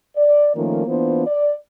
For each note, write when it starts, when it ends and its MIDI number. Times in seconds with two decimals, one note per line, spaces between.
0.17 0.51 74
0.56 0.86 51
0.56 0.86 53
0.56 0.86 57
0.56 0.86 58
0.56 0.86 61
0.56 0.86 65
0.87 1.26 52
0.87 1.26 58
0.87 1.26 59
0.87 1.26 62
0.87 1.26 65
0.87 1.26 72
1.27 1.53 74